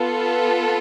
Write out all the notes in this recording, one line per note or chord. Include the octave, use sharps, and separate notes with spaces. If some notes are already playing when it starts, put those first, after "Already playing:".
Already playing: B3 F4 A4